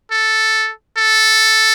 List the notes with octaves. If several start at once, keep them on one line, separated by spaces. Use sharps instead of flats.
A4
A4